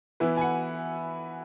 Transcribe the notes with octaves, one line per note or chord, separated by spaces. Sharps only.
E3 B3 E4 B4
G#5
F#5